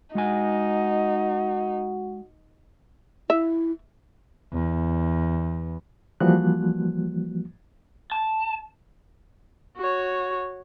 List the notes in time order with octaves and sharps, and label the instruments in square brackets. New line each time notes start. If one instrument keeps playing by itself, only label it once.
[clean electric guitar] G#3 F#5 G#5 [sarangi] D#4 [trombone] F#4
[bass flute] E4 [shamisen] E5
[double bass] E2
[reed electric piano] E3 F3 G3 A#3 F#4 F#6
[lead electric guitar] A5
[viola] F#4 C#5